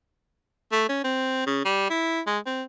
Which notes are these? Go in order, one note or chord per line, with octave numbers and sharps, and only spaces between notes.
A3
C#4
C4
C#3
G3
E4
G#3
C4